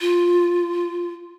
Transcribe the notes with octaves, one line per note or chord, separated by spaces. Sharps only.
F4